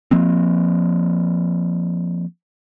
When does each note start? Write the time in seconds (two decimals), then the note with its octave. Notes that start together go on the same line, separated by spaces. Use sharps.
0.11 F3 A#3 C4